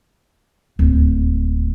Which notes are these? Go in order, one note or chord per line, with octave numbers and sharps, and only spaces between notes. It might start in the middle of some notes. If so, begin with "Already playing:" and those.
D1 D#2